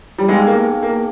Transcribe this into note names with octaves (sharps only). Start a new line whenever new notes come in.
G3
G#3 B3 D#4 G#4 B4 G5
A#3
A#3